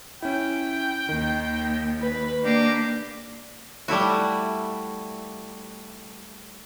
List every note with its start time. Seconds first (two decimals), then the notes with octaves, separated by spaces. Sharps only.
0.22 C#4 E4 G5
1.09 D#2 D#3
2.01 B4
2.44 A#3 D4 G4
3.88 G3 A3 E4 F#4